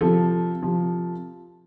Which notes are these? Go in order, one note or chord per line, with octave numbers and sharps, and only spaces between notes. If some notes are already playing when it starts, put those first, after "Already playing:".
C3 F3 A4
C3 F3